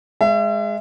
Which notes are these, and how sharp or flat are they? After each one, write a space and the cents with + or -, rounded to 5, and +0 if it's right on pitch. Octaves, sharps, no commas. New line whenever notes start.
G#3 +0 E5 +40